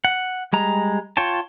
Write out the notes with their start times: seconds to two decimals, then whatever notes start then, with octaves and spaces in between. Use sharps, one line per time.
0.05 F#5
0.53 G3 G#3 A#5
1.17 F4 C#5 G5 A5